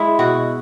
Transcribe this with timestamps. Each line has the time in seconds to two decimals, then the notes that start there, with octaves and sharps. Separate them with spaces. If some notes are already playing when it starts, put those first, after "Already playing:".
Already playing: G#3 E4
0.19 B2 F#4